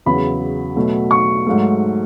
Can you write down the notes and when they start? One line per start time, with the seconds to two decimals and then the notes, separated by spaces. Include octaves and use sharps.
0.06 E2 C#3 F#3 B5
0.76 B2 F#3 A3
1.11 C#6
1.46 G#2 F#3 A3